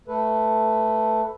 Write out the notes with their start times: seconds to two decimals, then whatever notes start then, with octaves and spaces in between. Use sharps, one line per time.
0.08 A3 A4 B4